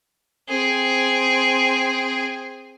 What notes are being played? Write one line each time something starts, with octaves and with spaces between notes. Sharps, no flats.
C4 G#4